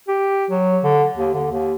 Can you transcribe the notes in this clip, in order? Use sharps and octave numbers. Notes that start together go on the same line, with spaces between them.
G4
F#3
D3
D#2
D3
D#2